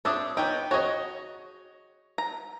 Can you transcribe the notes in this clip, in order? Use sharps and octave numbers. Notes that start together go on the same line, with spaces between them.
C4 D4 C#5 E5 D6 D#6
B3 C#4 D#4 G5
F#4 G#4 C#5 D#5
A#5